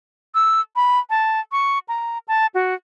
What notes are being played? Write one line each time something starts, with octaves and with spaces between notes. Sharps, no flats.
E6
B5
A5
C#6
A#5
A5
F#4